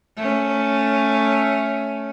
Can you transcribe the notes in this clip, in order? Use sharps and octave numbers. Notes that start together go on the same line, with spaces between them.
A3 C#4